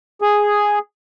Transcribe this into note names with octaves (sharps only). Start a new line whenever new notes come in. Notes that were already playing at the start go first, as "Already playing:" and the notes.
G#4